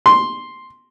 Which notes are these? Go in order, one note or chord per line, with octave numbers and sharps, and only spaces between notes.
C6